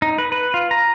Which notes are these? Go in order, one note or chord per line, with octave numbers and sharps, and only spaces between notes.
D#4
B4
B4
F4
A#5